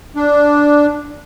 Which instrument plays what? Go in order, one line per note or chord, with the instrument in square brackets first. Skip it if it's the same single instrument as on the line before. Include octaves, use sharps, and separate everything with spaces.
[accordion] D4